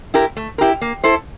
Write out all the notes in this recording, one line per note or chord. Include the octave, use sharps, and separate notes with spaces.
E4 G4 A#4
A3
E4 G4 A#4
A#3
E4 A4 C5